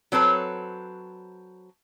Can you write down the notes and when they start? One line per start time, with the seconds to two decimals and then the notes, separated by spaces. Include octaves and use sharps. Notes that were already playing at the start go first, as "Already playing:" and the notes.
0.12 F#3 C4 A4 B4 C#5